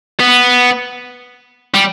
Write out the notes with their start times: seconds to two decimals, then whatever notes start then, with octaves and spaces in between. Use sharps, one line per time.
0.20 B3
1.74 G3